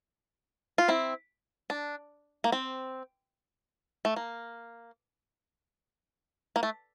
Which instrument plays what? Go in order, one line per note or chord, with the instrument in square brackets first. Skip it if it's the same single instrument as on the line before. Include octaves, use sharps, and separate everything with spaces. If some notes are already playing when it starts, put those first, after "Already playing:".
[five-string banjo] F4
C4 E4
D4
A#3
C4
A3
A#3
A#3
A3